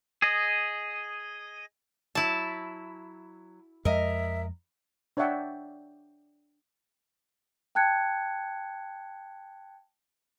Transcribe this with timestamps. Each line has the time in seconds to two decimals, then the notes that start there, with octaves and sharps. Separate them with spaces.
0.22 G#4 D#5
2.15 F#3 E4 A5
3.85 F2 G#3 A#4 D#5 E5
5.17 D4 C#5 D5 E5 F#5 G5
7.75 G5 A5 F#6 G#6 C#7